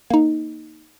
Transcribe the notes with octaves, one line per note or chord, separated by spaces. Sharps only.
A#3 D#4